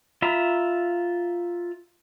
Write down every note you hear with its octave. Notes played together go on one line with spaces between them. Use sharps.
F4 E5 A#5 B5